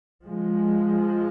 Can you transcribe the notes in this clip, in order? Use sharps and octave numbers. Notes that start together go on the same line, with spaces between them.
F3 G#3